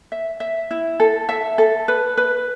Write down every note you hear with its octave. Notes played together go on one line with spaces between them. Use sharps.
E5
E5
E4
A4
E5
A4
B4
B4